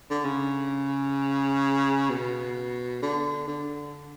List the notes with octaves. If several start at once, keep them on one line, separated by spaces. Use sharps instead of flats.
D3
C#3
B2
D3
D3